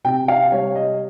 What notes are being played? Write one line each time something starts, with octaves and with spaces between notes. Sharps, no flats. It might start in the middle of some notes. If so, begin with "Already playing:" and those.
C3 G5
F5
G3 C#5
D#5